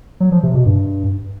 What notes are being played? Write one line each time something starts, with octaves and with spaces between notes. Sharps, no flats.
F#3
F3
C3
B2
G2